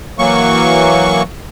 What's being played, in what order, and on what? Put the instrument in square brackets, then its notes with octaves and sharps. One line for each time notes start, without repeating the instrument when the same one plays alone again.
[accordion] E3 F#3 A#3 C#6